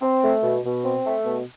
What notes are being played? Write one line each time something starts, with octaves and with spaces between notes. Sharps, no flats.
C4
A3
B2
B2
C4
A3
B2